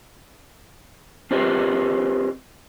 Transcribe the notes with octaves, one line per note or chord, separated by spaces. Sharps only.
C4 F4 G4 G#4 A#4 B4